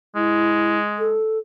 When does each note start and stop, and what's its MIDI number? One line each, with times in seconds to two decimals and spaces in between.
0.15 1.20 56
0.15 0.78 64
0.99 1.39 69